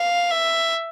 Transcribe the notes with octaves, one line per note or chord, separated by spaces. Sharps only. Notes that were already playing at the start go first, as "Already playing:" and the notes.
Already playing: F5
E5